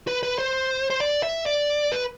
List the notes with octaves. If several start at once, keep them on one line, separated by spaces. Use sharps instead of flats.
B4
B4
C5
C5
D5
E5
D5
B4